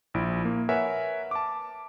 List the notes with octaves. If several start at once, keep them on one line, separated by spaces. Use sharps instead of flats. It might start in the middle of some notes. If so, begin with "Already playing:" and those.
A#1 E4 D7
A#3
A#4 B4 C#5 E5 F#5 G#5
A5 D6